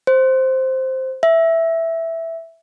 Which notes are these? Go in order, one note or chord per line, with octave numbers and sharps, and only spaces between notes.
C5
E5